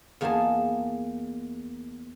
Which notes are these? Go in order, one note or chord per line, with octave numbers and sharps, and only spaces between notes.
E2 A#3 B3 D#4 G#4 A5